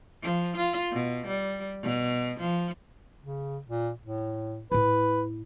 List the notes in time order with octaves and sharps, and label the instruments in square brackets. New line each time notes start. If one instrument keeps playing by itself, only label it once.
[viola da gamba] F3
F4
B2
G3
B2
F3
[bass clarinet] C#3
A#2
A2
[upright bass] A2 E4 [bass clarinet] B4